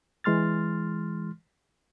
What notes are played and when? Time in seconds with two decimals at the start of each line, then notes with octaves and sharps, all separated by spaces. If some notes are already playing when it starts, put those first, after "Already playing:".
0.24 E3 G#3 C6 F6 A6